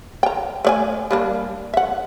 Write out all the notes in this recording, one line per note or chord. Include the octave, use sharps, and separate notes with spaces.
G5 A#5
A3 D5 G#5
G3 A#3 D4
E5 F#5